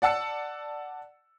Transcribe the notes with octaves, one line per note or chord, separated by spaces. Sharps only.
D5 F#5 A5 E6 C#7